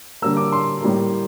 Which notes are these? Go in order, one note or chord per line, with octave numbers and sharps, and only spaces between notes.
D3 G3 A#3 E6
D6
C6
A2 G3 A#3